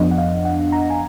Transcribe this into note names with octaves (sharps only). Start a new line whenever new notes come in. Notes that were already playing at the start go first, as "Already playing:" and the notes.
Already playing: F2 F3 B3 D4 D#5
F#5
F5
F#5
A#5
G#5